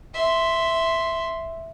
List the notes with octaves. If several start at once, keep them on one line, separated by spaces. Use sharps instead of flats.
E5 C6